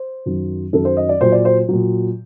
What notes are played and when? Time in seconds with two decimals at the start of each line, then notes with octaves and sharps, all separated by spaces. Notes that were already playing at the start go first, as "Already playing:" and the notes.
Already playing: C5
0.26 F#2 D#3 F#3
0.73 F#2 D#3 F#3 A4
0.85 C5
0.97 D#5
1.09 D5
1.21 A#2 F#3 C5
1.32 D5
1.45 C5
1.69 A#2 F#3